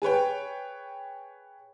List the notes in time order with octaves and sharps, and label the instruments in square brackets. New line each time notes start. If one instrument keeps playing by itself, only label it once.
[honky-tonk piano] G#4 B4 C#5 G5